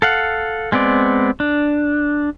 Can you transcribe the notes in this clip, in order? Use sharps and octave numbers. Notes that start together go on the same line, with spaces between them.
A4 F5 F#5
G#3 B3 C4 D5
D4